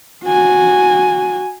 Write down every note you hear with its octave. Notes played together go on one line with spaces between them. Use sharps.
F#4 G#5